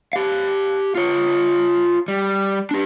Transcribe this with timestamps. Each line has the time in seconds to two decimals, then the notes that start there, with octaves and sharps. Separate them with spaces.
0.13 G4 F5
0.95 F4 C#5
2.08 G3
2.71 D4 G4